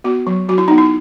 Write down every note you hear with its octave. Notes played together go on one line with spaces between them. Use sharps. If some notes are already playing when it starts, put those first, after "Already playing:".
B3 F#4
F#3
F#3 F#4
E4
B3 D#4
E4